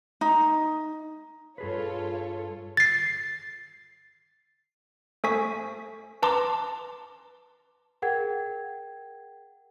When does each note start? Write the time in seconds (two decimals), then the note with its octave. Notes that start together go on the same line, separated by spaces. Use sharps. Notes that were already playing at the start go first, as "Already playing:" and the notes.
0.21 D#4
1.58 G2 F4 G#4 A4 B4 C#5
2.77 A6 C7
5.24 A3 A4 C5 G#5 C#6 B6
6.23 B4 A5 A#5 C6 D6
8.02 G#4 A#4 F#5 G5 G#6